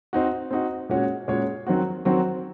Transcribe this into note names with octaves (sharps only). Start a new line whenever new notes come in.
C4 D#4 F#4
C4 D#4 F#4
A#2 G#3 C#4 F#4 C#5
A#2 G#3 C#4 F#4 C#5
D#3 F#3 C4 F#4
D#3 F#3 C4 F#4